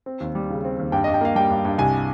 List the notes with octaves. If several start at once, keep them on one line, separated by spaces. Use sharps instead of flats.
C4
D#2
G3
C#3
C4
D#2
G2 G5
D#5
G2
G5
A#3 F5
G3 G5
G2
G2
C2 G#5